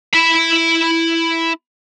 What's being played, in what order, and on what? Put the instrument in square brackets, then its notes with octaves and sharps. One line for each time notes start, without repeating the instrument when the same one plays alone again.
[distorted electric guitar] E4 B5